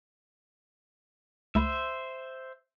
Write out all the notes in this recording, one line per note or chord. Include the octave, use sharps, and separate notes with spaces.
C#2 A3 C5 E5 B5